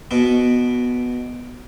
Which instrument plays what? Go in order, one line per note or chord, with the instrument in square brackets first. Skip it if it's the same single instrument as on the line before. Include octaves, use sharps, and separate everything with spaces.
[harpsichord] B2 B3